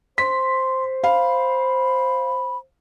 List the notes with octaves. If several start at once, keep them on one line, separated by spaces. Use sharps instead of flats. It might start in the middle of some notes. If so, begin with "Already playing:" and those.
C5 C6 B6
F5 B5